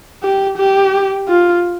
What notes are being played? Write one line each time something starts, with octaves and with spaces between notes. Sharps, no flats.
G4
G4
F4